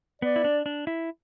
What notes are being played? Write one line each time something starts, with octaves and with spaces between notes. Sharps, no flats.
B3 D5
E4
D4
D4
E4